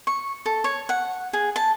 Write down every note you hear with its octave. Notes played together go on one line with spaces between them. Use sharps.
C#6
A4
C#5
F#5
G#4
A5